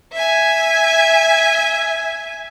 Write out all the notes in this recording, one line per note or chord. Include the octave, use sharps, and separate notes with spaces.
E5 G#5